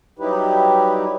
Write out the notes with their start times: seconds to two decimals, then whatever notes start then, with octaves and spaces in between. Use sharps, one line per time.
0.19 F#3 G3 D#4 E4 G4 B4